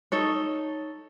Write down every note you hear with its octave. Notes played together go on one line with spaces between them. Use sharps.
D#4 A4 C#5